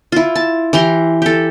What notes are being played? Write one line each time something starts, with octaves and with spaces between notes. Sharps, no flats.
E4 F4
A5
E3 G4 A#5 C6
G4 A4